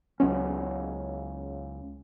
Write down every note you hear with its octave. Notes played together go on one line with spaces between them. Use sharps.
C#2 F#3 B3 C#4